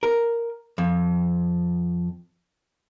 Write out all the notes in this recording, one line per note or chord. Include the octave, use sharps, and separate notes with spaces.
A#4
F2